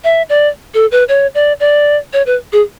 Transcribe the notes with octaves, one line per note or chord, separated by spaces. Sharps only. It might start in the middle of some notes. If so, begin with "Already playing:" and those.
E5
D5
A4
B4
C#5
D5
D5
C#5
B4
G#4